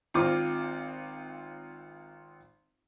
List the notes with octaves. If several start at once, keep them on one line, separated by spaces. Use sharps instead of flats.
G#1 C4 F4 D6